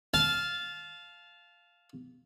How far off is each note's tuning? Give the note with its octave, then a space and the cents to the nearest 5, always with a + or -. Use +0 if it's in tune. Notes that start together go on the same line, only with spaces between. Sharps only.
F5 +0 A5 -20